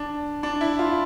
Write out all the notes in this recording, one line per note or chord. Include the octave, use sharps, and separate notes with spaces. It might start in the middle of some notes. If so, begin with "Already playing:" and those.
Already playing: D4
D4
E4
F4